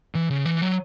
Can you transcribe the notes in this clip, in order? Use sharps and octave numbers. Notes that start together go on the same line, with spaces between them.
E3
C#3
E3
F#3